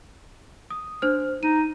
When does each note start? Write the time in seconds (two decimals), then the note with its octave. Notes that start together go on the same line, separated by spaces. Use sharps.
0.70 D#6
1.02 D4 C5 F6
1.43 D#4 D#7